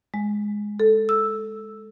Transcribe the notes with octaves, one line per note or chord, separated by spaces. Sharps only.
G#3
A4
E6